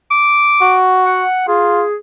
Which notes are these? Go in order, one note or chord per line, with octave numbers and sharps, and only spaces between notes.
D6
F#4
F#5
F4 G#4